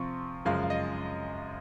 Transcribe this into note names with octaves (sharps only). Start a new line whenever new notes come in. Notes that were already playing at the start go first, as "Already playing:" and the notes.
Already playing: C3 F3 C4 F4 C#6
F#2 C#3 F3 G#3 F5
F5
D#5